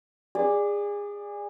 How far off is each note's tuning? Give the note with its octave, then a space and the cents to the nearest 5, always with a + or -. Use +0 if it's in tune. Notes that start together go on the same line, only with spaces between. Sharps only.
G#4 -25 D5 +5